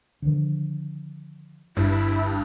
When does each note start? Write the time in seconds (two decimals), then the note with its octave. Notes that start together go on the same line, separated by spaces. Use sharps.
0.22 D3 D#3 F3
1.77 G1 G2 E4